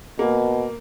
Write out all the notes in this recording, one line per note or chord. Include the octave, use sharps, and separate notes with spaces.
B2 A#3